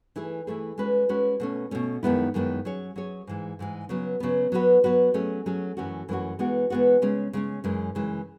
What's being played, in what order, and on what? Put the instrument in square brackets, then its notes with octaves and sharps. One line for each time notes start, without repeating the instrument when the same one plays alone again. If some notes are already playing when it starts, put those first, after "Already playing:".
[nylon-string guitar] E3 A3 E4 G#4
E3 A3 E4 G#4
G#3 C#4 F#4 B4
G#3 C#4 F#4 B4
B2 A3 C#4
B2 A3 C#4
F#2 D#3 G#3 B3 E4
F#2 D#3 G#3 B3 E4
F#3 C#4 G#4 C#5
F#3 C#4 G#4 C#5
G#2 E3 G#3
G#2 E3 G#3
C#3 F#3 B3
C#3 F#3 B3
F#3 B3 F#4 B4
F#3 B3 F#4 B4
F#3 A3 C#4 G#4
F#3 A3 C#4 G#4
F#2 E3 A3 C#4 F#4
F#2 E3 A3 C#4 F#4
E3 G#3 B3 F#4
E3 G#3 B3 F#4
C#3 G#3 C#4
C#3 G#3 C#4
F#2 C#3 E3 G#3
F#2 C#3 E3 G#3